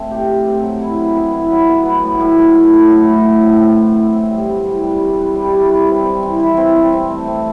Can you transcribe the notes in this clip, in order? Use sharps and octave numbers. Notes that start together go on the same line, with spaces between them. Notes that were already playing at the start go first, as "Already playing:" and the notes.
Already playing: A3 C4
G4
A3
C4
F#3
E4
F#3
B3
E4
F#3
B3
B3
A2
A2
A2
A2
A2
A2
A2
A2
C4
C4
E3
E3
C4
G3
C4
E3
G3
E4
B4
G3
E4
B4
C4
C4
E3
E3
C4
C4
C4
A3
C4